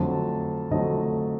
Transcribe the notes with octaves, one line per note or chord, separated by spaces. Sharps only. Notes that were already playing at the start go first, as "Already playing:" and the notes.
Already playing: F2 D3 F#3 A3 A5
F2 D3 F#3 A3 D#5